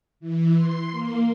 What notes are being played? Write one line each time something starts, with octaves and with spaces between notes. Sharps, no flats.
E3
C6
A#3